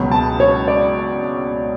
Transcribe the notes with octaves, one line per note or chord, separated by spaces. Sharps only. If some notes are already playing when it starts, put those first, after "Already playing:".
Already playing: C#2 B2 F#3
A5
C#5
D5